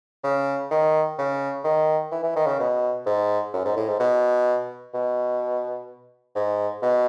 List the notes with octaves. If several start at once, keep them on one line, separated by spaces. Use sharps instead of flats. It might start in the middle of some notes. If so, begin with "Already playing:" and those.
C#3
D#3
C#3
D#3
E3
E3
D#3
C#3
B2
G#2
F#2
G#2
A2
G#2
B2
B2
G#2
B2